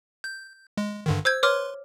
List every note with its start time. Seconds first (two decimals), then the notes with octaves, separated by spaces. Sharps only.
0.24 G6
0.77 G#3
1.06 G2 D3 D#3
1.25 C5 E6 G6 G#6
1.43 B4 C#5 C6 D6 F6